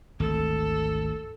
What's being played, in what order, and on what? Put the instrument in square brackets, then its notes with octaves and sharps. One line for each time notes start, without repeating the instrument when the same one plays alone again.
[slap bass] G#1 D2 [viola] A4